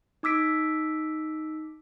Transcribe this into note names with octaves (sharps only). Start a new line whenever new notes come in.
D#4 D6 E6 B6 D7